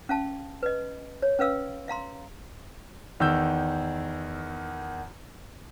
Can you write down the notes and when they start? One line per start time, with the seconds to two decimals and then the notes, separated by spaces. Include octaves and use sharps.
0.09 C#4 F5 A5
0.63 B4 D#5
1.22 C#5
1.39 C#4 B4 F5 E6
1.88 E5 F5 A#5 C6
3.20 E2 D#3 E6 G6